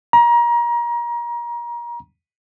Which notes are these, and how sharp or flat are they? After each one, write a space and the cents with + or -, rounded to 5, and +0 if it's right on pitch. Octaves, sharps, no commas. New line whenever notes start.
A#5 +30